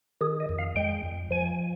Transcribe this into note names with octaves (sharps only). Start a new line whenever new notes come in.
D#3 G#4
D#5
F2
F5
G#3 G5
F2
F3 G#5